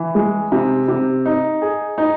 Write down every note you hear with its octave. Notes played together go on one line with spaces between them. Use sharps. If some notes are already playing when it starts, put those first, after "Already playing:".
Already playing: E3
G#3
C3
C3
D#4
G#4
D#4